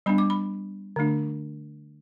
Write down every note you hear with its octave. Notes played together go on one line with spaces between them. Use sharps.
G3 B3 D4 B5
D6
B5
D3 A3 D4